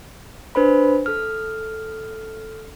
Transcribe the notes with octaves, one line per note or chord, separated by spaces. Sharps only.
D4 B4 C5 B5
A4 F6